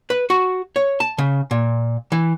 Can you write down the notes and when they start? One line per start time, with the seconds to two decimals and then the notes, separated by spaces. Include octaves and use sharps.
0.10 B4
0.30 F#4
0.76 C#5
1.00 A5
1.18 C#3
1.51 A#2
2.12 E3